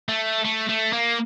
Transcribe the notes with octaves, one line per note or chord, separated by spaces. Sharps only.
A3
A3
A3
A#3